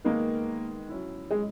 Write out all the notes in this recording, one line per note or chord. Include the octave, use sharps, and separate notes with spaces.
D#3 G#3 A#3 B3
F#3 C#4 E4
G#3